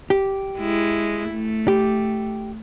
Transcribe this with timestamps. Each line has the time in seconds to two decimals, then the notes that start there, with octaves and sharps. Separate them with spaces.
0.10 G4
0.59 G#3 E4
1.30 A3
1.68 G4